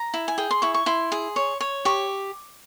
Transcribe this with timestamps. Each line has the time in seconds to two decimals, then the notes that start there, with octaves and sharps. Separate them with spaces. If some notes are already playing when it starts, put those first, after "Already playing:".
Already playing: A#5
0.14 E4
0.28 G#5
0.38 G#4 G5
0.51 C6
0.62 E4 C#6
0.74 C#6
0.86 E4 C6
1.12 G#4
1.36 C#5
1.61 C#5
1.85 G4 C#6